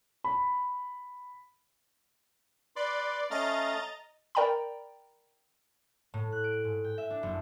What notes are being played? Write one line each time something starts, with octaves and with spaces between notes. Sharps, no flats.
B5
B4 D5 B5 C6
A3 C#4 D#5 F5 A#5 A6
A#4 D5 G5 A#5 B5
A2
F#6
D7
G#2
G5
E5
D4
F#1